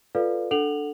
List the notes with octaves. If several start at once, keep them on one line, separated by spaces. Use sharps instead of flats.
F4 A4 B4 D5 F5
D4 A4 F#5 F7 F#7